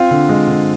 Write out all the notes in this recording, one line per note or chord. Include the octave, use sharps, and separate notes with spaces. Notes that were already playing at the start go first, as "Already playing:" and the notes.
Already playing: C4 F4
D3
G#3
D3